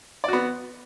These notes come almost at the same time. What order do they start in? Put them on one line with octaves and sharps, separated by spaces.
D5 F#4 B3